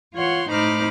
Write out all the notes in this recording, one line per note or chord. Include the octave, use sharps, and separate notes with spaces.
E3 F4 C#5 F#5 C6
A2 D#4 C5 B5 D6 F6